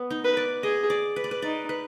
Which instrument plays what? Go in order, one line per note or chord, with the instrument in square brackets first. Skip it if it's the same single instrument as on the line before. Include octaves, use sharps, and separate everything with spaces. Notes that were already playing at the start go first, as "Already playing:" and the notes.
Already playing: [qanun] B3
D#4
[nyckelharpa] B4
[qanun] D5
[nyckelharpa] G#4 [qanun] D#5
[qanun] D5
B4
D5
B4
[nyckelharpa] D#4 [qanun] D5
[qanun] B4